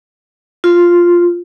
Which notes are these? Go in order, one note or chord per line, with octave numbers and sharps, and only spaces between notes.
F4